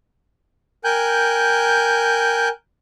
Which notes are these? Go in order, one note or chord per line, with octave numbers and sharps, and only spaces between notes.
A#4 G5 G#5 F#6 G6